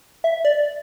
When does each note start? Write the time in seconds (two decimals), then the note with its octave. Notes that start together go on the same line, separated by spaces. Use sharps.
0.24 E5
0.45 D5